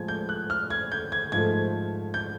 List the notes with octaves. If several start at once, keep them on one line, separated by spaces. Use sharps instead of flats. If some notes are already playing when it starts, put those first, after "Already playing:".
Already playing: A2 F3 G#3 G#6
G6
F#6
F6
G#6
G6
G#6
G#2 F3 A3 G#6
G6